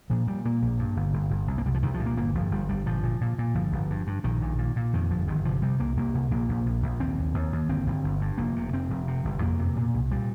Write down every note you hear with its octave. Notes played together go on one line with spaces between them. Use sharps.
A#2 F3
A#2 G3
A#2 A#3
A#1
G2
G1
G1
G1
C2
A#3
C2 G3
F3
C2 D#3
F3
A#2
A#3
G1 A#3
G1 F3
G1 G3
G1 G3
A#2 F3
A#2
A#2
A#2
G1 F3
G1
G2
G2
A#1 D#3
A#2
A#2
A#2
F2 D#3
G1 F3
G1 D#3
C3 F3
C3 G3
C2 A#3
C2 A#3
C2
A#1 A#3
A#1
A#1
A#1
D#2 C4
D#2
D#2
D#2
G1 C4
G1
G1
G2
F1 A#3
C3
F1 C4
F1
C3
G1
F2 A#3
C3
A#2
C2
A#2 G3